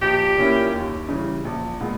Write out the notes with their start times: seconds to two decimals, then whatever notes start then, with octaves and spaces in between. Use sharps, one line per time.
0.02 A#1 G4
0.37 A#2 A#3 C#4 E4
0.73 D#2
1.09 C#3 E3 G3 C#4
1.45 A#1
1.81 A#2 G#3 B3